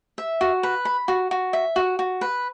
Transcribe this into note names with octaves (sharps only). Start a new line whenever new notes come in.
E5
F#4
B4
B5
F#4
F#4
E5
F#4
F#4
B4